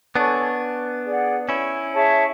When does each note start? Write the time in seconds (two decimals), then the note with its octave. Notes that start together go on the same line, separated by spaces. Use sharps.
0.15 B3 D4 A4 C#5 G#5 C#6
1.04 G#4 D5 F#5
1.49 C#4 E4
1.92 G#4 C#5 E5 A5